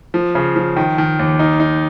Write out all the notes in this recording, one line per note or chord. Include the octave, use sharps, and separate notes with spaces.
F3
C#3
F3
D#3
D#3
D#2
D#4
D#4